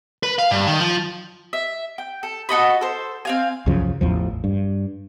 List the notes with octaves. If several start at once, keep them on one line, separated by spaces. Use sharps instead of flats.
B4
F5
G2
D#3
F3
E5
G5
A4
F#4 A4 D#5 B5
A4 C5
C4 F5 G#5
C2 F#2 C#3 F3
A1 E2 F3
G2